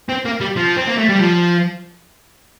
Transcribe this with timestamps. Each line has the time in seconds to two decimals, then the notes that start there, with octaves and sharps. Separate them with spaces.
0.09 C4
0.25 A#3
0.40 G3
0.56 F3
0.77 C4
0.88 A#3
0.98 A3
1.09 G3
1.19 F3